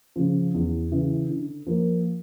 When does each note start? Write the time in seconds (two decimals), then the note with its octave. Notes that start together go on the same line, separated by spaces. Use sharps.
0.16 C#3 F3
0.54 E2
0.91 C#3 E3
1.29 D3
1.67 F3 A#3